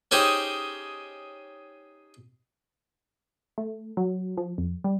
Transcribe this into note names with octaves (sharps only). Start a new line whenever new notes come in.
C#4 D#4 G4 G#4 C5 G5
A3
F#3
F3
F2
G3